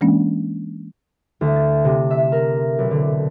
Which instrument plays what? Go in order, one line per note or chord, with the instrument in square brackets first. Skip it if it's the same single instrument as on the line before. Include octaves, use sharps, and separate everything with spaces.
[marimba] E3 G#3 A#3 C#4 D4
[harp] D2
A6
C3
E5
A#4
B1
D3